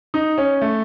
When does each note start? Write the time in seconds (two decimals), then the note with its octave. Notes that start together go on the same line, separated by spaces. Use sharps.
0.14 D#4
0.38 C#4
0.61 A3